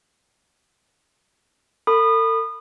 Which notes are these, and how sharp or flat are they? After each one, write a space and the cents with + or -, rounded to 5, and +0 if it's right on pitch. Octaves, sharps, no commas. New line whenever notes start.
A4 +40 B5 +0 D#6 -30